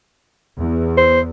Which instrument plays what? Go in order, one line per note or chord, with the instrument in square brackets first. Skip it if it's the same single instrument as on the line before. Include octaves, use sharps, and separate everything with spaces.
[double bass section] E2
[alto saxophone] C5